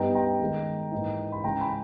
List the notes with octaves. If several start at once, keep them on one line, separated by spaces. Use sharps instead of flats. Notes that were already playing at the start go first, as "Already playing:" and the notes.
Already playing: G2 G3 B3 D#4 G5 A#5
G5 A#5
D#3 G#3 D#4
G#2 E3 A#3 D#4
B5
C#3 E3 G#3 G5 A#5
G#5 B5